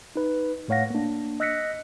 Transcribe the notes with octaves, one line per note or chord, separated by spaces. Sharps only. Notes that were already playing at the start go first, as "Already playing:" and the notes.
D#4 B4
A2 A3 C#5 F5 F#5 A#6
A#3 D4
D#5 E6 F#6 A#6 B6 C#7